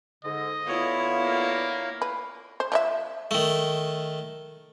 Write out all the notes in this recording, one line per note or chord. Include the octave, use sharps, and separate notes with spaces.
G#2 D3 D#5
D3 B3 E4 F4 C#5 F5
A#3
B4
C5
F3 D#5 E5
D#3 A3